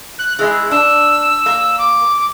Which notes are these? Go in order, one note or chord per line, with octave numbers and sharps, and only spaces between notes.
F#6
E3 G#3 E4 G#4
D4 E6
A#3
D6